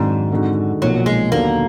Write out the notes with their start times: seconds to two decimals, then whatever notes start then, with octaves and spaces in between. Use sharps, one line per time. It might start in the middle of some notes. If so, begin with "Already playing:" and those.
Already playing: F2 G#2 D#3 F#3 D4
0.30 F2 D3 G#3 D#4 F#4
0.82 B1 A#2 F3 F#3 A#3
1.06 G#3
1.32 D#2 D3 F#3 A#3 B3 D4